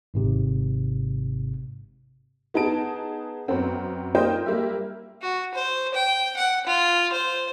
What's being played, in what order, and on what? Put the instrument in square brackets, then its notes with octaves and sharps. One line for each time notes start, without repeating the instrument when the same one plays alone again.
[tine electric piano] G#1 G#2 C3
[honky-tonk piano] B3 D#4 G#4 A5 D7
F#2 B3 C4
A#3 D#4 F4 C5 D#5 G5
G3 A#3 G4 E5
[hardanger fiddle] F#4
C5
G5
F#5
F4
C5